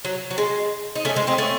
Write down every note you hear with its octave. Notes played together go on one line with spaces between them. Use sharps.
F#3
F#3
G#3
D#4
A3 C#4
G#3 C4
C4 D#4
A3 C#4